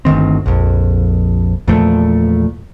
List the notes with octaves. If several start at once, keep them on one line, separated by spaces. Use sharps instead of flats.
G1 D2 D#3 C4
A#1 F2
E2 A#2 F3 A3